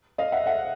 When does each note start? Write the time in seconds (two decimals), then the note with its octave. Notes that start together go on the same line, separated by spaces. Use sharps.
0.18 D#5 F5
0.32 E5 F#5
0.46 E5 F#5